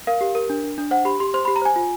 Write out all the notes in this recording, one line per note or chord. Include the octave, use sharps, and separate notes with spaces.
A#4 F5
G4
A#4
D4
D4
D4
C5 F#5
G4 B5
G4 C6
C5 C6
B5
G4
A#5
C5 G#5
F4